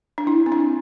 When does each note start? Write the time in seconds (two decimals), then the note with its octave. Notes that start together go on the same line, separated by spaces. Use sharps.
0.18 D4
0.27 E4
0.46 C4
0.52 D4